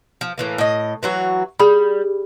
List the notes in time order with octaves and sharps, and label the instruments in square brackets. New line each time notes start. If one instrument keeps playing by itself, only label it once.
[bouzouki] F3
A2 E3 A#3
A2 D#5
E3 F#3 F#4
[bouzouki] G3 [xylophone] G#4 B5